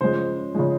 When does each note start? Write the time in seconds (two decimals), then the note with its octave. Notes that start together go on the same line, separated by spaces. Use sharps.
0.01 C#3 F3 G#3 C5
0.55 C#3 F3 G#3